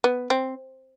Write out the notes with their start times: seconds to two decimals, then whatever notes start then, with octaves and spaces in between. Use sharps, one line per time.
0.04 B3
0.30 C4